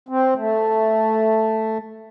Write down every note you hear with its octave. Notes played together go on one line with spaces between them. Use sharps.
C4
A3